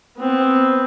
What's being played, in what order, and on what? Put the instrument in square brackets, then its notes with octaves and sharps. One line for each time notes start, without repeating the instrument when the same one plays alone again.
[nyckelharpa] B3 C4